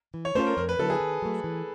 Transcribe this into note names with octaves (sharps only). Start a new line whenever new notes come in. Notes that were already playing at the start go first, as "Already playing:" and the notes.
E3
C#5
A3 C#4 F4 A4 C5
A#4
F2 A#4
B4
D3 F#3 B3 E4 A4
G#4
D#3
F#3 A3
E3